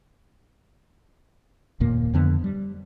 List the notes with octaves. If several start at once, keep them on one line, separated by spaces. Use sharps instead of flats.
F#1 D#2 A#2 A#3
F2 D3 B3
G3